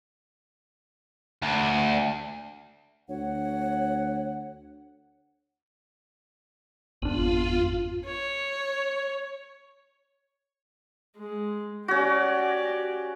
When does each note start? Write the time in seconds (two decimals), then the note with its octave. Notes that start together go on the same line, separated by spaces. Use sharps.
1.42 D2
3.09 D2 C#5 F#5
7.02 G#1 F2 B3 D4 F4
8.05 C#5
11.18 G#3
11.88 C#4 F#4 G4 D5